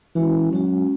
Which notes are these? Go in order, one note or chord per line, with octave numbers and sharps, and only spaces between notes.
E3 G#3 C#4 F#4
F#3 G#3 C#4 F#4